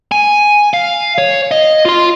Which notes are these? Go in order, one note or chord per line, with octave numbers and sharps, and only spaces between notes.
G#5
F5
C#5
D#5
F4 C6